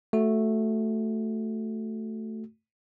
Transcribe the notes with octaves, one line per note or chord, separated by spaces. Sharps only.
A3 F#4